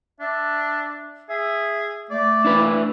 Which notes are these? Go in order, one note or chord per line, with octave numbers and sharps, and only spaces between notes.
D4 E5
G#4 E5
A3 D5
D4 E4 B4